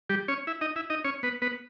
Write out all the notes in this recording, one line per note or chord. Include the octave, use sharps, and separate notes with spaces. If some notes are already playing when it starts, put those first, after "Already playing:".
G3 G4
C#4 C#5
E4 E5
D#4 D#5
E4 E5
D#4 D#5
C#4 C#5
B3 B4
B3 B4